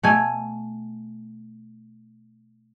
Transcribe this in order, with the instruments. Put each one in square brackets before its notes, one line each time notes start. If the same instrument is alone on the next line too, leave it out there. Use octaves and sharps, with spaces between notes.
[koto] B2 A3 G#5